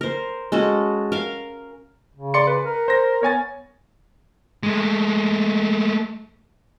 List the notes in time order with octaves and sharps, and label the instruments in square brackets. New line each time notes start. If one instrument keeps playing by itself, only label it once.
[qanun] A#4 C5
G#3 C#4 F#4 A4
A#4 F5
[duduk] C#3
[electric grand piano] D5 C6 C#7
B4
[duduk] A#4
[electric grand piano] C5 A#6
[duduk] B3 [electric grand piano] C#5 G#5 A6
[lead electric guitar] G#3 A3